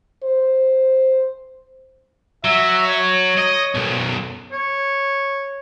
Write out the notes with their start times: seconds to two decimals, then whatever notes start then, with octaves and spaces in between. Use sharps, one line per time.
0.24 C5
2.45 F#3 E5
2.87 C#5
3.38 D#5
3.75 B1 F#2
4.52 C#5